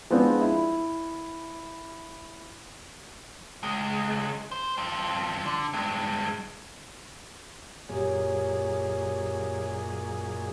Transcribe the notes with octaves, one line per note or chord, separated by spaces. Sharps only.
F3 G#3 B3 C4 D4
E4
C#2 G#3
C5
G2 F3
D3
G2 G#3
F#2 A#2 G4 G#4 C#5